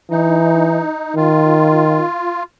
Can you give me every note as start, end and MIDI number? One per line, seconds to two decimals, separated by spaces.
0.11 0.83 52
0.11 1.15 63
1.16 2.03 51
1.16 2.43 65